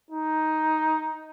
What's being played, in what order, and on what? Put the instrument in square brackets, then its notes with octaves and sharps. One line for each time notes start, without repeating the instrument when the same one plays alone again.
[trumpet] D#4